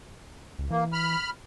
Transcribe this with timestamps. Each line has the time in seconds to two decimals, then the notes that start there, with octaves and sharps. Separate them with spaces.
0.59 C#2
0.70 E3 A#3
0.93 B5 F6